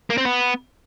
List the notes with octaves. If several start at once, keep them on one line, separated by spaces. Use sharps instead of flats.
A#3
C4
B3